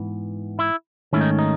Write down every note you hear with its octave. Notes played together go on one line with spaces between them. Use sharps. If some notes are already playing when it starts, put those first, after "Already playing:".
Already playing: G#2 E3 B3
E4
G#2 D#3 A3 C#4 E4
D#4
D#4